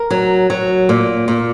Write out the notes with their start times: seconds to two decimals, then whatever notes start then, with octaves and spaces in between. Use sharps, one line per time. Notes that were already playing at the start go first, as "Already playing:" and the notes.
Already playing: A#4
0.11 F#3
0.50 F#3
0.89 A#2
1.28 A#2